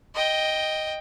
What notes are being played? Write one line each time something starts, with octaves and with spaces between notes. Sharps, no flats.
D#5 G5